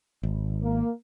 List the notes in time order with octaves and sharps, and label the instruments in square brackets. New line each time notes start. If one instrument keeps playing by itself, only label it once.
[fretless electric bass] G#1
[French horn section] A#3